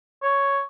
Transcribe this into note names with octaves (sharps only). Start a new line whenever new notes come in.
C#5